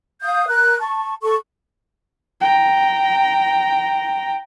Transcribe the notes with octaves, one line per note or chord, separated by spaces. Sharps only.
F5 D#6 G6
A#4 F#6
A5 C#6
A4 C#6
G5 A#5